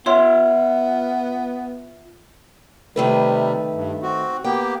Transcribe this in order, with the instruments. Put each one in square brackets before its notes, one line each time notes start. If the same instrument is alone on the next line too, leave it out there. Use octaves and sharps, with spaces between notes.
[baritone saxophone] B3 [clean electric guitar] F4 E5 F5 [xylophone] C#5 C6
[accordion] C3 G3 [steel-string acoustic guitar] D#3 A3 B4
[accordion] G2
C4 F#4
[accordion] A#3 B3 G4 [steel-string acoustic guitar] G5